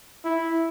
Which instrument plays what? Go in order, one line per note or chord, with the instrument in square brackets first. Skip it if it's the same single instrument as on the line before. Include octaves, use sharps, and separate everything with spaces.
[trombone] E4